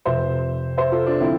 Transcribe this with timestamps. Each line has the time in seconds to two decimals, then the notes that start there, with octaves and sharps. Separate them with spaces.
0.05 F1 F2 C3 C5 E5
0.78 C5 E5
0.92 F4 A4
1.06 D4 F4
1.20 D3 F3 C4 E4